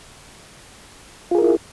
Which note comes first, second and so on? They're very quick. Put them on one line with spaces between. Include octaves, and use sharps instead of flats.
F4 G#4 A#4 E4